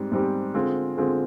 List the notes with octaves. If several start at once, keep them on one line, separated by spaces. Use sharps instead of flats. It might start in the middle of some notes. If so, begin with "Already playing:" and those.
Already playing: G#2 G3 C4
G#2 G3 C4 G4
D3 G#3 C4 F4 G#4
D3 G#3 C4 F4 G#4